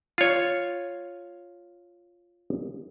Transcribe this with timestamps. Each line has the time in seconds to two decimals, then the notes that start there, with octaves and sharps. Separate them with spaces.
0.18 F4 C#5